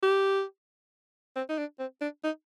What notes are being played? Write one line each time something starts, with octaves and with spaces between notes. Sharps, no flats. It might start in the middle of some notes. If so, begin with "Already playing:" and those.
G4
C4
D#4
D4
C4
D4
D#4